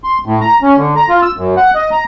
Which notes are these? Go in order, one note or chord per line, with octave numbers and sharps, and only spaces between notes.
C6
A2
A#5
C#4
D3
A#5
F4
E6
F#2
F#5
D#5
A#5